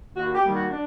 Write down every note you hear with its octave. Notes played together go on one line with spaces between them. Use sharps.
D#2 F#4
G4
D#3 G3 A#3
F#4
D4